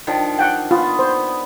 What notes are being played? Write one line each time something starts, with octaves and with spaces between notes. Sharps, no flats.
D#3 F3 D4
F#5 G5
B3 F4
C5